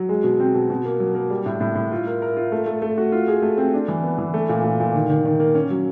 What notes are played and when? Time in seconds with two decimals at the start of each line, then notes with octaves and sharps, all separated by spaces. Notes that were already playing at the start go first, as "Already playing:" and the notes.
Already playing: F#3
0.09 G#3
0.24 B2
0.40 C4
0.55 B2
0.70 B2
0.85 A#3
1.00 F#3
1.15 A#3
1.30 G3
1.46 A2
1.61 A2
1.75 A2
1.92 F4
2.07 A#4
2.22 A#4
2.37 F4
2.52 A3
2.66 A3
2.82 A3
2.98 F#4
3.12 F4
3.27 G#4
3.42 A3
3.58 C4
3.74 D4
3.88 E3
4.03 B3
4.18 E3
4.34 A3
4.49 A#2
4.64 A#2
4.80 A#2
4.94 D#3
5.10 D#3
5.25 D#3
5.40 A#3
5.55 C#4
5.70 F#3